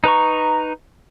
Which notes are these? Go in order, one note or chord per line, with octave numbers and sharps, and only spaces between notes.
D#4 B4 A#5 C#6